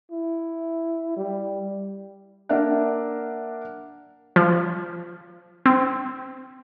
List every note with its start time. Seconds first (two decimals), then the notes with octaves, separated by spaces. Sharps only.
0.11 E4
1.17 G3
2.49 A#3 D4 A#4 D5 E5 F#5
4.36 F3
5.66 C4